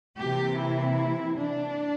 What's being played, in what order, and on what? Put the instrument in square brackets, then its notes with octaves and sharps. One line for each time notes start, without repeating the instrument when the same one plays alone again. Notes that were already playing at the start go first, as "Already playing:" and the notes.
[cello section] C3 E3 A#3 G4
E4
D4